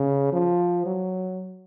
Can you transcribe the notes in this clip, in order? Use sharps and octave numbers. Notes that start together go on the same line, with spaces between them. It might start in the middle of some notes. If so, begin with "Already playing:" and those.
Already playing: C#3
F3
F#3